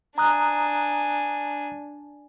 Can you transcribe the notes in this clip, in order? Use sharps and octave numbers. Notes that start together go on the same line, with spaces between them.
D4 G#5 A#5 D#6 F#6